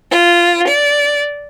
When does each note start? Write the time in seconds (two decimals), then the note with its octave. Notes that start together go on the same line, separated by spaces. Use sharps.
0.11 F4
0.67 D5